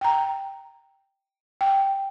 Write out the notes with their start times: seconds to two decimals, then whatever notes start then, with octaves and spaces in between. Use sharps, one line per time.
0.01 G5 A#5
1.61 G5